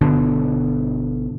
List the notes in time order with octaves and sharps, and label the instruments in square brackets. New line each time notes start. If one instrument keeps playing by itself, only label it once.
[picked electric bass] G1 B2 D3